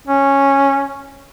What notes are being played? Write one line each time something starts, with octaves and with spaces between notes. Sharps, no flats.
C#4